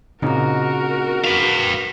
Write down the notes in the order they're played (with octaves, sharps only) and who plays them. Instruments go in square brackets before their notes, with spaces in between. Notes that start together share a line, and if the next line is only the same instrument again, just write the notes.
[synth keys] A#2 C#3 D#4 [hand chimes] C4 A#5 [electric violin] F#4 A#4
[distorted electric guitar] B4 F5